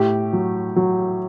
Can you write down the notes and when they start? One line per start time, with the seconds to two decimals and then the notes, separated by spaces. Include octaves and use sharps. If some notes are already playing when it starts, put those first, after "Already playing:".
Already playing: A2 G4
0.33 F#3
0.76 F#3